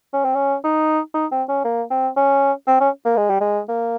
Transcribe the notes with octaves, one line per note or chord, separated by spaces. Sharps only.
C#4
C4
C#4
D#4
D#4
C4
C#4
A#3
C4
C#4
C4
C#4
A#3
G#3
G3
G#3
A#3